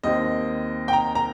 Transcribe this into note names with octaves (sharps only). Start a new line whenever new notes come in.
D#2 D#3 C4 D#5
G5
A#5
A#5